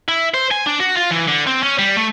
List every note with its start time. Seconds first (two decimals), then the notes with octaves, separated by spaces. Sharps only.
0.09 E4
0.34 C5
0.51 G#5
0.66 D4
0.80 F#4
0.96 F4
1.11 E3
1.28 D3
1.47 C4
1.63 C#4
1.79 G3
1.97 A3